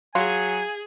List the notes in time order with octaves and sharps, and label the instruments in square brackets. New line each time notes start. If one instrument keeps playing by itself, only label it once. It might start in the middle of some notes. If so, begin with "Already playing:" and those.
[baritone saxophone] F#3 [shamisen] F4 [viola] G#4 [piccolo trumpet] G#5